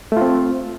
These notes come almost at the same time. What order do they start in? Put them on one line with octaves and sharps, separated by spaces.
A3 F4 C4